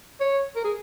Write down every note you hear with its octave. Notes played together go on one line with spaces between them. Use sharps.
C#5
A#4
G#4